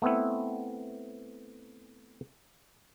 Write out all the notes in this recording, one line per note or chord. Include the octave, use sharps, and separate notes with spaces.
A3 B3 C4 E4